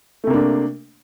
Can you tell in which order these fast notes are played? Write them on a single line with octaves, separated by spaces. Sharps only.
A3 C3 A#3 D4